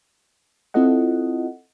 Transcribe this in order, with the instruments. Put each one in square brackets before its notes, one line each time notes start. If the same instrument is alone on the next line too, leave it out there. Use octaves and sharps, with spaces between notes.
[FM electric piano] C4 E4 F4 A4 D#5 F#5